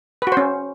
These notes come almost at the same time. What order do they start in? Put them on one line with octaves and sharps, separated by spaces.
B4 F#4 C5 C#4